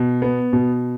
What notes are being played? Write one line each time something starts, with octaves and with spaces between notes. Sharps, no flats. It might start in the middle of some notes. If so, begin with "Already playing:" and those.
Already playing: B2
B3
B2